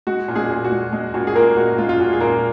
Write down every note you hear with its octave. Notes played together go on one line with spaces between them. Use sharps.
G#3 F#4
A#2
G#3 G#4
A#2
F#4
G#3
G#3
A#2 F#4
G#4
A#2 A#3 A#4
G#3 F#4
G#3 F4
F4
A#2 F#4
G#4
A#2 A#3 A#4